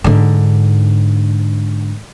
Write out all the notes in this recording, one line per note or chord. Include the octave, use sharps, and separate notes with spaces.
G#2 D3